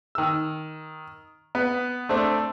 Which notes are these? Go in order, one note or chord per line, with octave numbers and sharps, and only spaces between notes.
D#3 E6
B3
A3 C4 D4